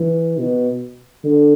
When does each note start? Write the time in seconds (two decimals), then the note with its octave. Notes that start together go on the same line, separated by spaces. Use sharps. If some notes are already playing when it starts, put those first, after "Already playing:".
Already playing: E3
0.39 B2
1.24 D3